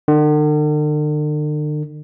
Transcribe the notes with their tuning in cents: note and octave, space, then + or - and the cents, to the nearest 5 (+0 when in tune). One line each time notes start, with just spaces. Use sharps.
D3 +45